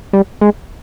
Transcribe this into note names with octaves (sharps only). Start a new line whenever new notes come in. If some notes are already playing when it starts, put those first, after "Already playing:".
G3
G#3